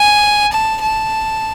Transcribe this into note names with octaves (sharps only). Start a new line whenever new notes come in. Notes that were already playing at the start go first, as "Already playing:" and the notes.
Already playing: G#5
A5
A5